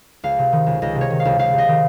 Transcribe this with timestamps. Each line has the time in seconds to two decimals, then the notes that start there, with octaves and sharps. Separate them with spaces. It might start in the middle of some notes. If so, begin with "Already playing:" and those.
0.23 C#2 F5
0.38 C3
0.52 D#3
0.66 C#2
0.82 C#2 D#5
0.95 C3
1.01 C#5
1.10 D#3
1.20 F5
1.25 C#2
1.39 C#2 F5
1.53 C3 D#5
1.68 D#3